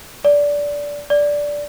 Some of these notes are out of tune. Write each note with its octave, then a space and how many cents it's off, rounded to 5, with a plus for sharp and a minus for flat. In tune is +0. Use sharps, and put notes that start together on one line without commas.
D5 -15
D5 -10